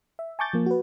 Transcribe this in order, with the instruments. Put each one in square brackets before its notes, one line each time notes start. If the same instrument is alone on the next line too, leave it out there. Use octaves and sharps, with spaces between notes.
[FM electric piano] E5
G#5 A5 C#6 D6 G6 A6
F3 A#3
F#4 B4